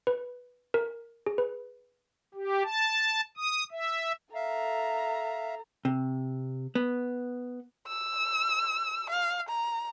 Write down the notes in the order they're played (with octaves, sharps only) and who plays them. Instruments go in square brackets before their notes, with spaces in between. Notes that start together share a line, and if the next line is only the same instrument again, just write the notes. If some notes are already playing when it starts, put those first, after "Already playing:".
[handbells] B4
A#4
G#4
B4
[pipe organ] G4
A5
D#6
E5
[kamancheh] A4 A#5 [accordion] E5 F5
[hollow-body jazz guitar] C3
B3
[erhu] E6
F5
A#5